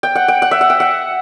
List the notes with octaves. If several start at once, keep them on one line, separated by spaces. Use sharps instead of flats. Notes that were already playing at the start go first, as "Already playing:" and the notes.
G5
F#5
G5
F#5
E5
F#5
G5
F#5